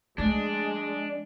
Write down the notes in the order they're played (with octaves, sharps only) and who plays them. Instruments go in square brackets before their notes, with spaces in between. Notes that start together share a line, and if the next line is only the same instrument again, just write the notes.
[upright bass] F3 A3 [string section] G#3 [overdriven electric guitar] D4